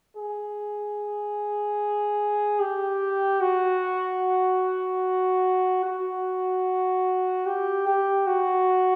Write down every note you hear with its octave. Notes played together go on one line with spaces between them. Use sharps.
G#4
G4
F#4
F#4
G4
G4
F#4